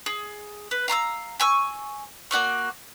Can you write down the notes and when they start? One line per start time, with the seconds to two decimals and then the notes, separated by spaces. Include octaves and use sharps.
0.06 G#4
0.71 B4
0.88 F5 A#5 C6 E6
1.40 G#5 C#6 E6
2.31 A#3 F#4 D5 C#6